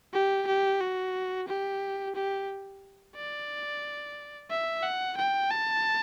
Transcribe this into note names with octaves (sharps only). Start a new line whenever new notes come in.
G4
G4
F#4
G4
G4
D5
E5
F#5
G5
A5